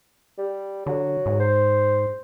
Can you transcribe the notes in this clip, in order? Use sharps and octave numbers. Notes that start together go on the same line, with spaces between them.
G3
D3 F#3
G#2
C5